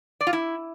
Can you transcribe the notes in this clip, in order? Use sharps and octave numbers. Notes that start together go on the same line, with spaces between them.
D5
F4
E4